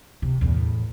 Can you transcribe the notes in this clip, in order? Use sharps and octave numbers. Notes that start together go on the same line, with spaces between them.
C3
E2 A2